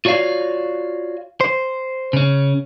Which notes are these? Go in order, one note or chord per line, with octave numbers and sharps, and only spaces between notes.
F4 F#4 C#5 D5 F5
C5
C#3 C#4